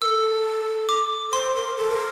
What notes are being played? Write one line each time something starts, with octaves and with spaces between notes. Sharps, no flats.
A4 A#4 E6
D6
C5 C6
A#4
A4
A#4